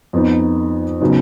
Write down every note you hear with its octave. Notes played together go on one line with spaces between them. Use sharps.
F2 F3 B3 D#4
C#3 F#3 B3 D#4